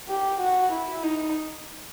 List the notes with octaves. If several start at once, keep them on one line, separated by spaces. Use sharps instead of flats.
G4
F#4
E4
D#4